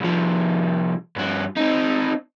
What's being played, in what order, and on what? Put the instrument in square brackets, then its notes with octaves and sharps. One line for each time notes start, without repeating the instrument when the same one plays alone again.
[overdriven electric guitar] C2 F3
G2 F#4
C4 D#4